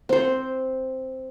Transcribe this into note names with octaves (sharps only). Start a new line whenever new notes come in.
C4 C5